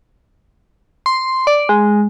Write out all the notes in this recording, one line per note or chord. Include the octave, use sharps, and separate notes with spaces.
C6
D5
G#3